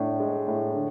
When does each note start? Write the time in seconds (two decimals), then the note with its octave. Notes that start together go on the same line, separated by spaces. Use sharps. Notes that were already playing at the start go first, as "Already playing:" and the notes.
Already playing: A2 D4
0.20 G#3
0.47 A2
0.74 D3